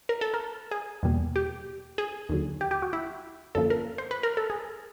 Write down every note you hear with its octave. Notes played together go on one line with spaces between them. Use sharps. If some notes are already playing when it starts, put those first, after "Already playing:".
A#4
A4
A#4
G#4
E2 B2 G3 A#3
G4
G#4
D#2 D3 F#3
G4
G4
F#4
E4
F#2 D3 F3 A#3 A4
A#4
C5
B4
A#4
A4
G#4